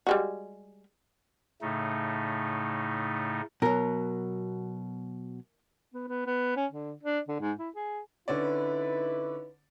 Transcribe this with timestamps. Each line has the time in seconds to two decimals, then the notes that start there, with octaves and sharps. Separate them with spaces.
0.07 G3 G#3 F#4
1.62 A2 C#3 A3 D#4
3.62 B2 F#3 A#4
5.94 B3
6.08 B3
6.27 B3
6.56 C#4
6.72 D3
7.03 D4
7.28 D3
7.40 G#2
7.59 E4
7.76 G#4
8.28 D3 C#4 D#4 E4 B4 D5